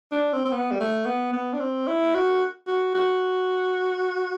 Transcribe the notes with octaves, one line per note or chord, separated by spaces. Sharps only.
D4
C4
C4
B3
G3
A3
B3
B3
D4
C4
E4
F#4
F#4
F#4